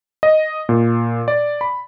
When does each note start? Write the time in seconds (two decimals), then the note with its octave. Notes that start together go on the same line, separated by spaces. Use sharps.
0.23 D#5
0.69 A#2
1.28 D5
1.61 B5